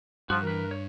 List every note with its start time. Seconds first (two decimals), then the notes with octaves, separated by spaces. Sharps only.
0.30 G2 F3 F#4
0.43 E3 A#4 B4
0.71 C#5